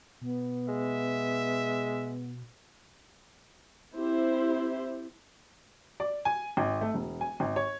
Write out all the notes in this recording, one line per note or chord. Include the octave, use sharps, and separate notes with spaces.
B2 B3
G#3 E5
C4 E4 G4 C5
D5
G#5
G#1
A3
E1
G#5
G#1
C#5